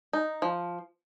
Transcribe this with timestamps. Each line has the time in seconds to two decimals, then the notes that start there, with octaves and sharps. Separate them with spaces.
0.13 D#4
0.42 F3